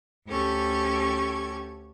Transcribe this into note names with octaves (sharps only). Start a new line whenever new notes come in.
D2 C#4 G4 A4 C#6 G#6